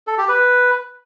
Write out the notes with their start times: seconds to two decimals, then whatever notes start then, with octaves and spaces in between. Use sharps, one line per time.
0.07 A4
0.18 G4
0.29 B4